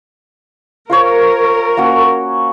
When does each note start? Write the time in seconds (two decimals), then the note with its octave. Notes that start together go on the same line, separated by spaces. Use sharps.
0.90 F4 A#4 C5 C#5
1.77 A#3 C#4 F#4